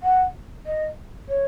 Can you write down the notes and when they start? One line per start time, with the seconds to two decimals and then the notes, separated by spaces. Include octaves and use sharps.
0.03 F#5
0.66 D#5
1.28 C#5